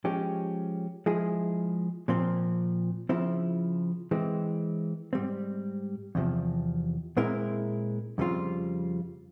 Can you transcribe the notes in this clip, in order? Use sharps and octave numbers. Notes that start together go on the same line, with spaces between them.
F3 G#3 C#4 G4
F3 G#3 E4 G#4
A#2 F3 C4
C#3 F3 C4 E4
E3 G#3 C4
G#2 G3 C4
E2 C3 F3
A#2 G#3 C4 E4 A#4
F2 C#3 G3 C4 F4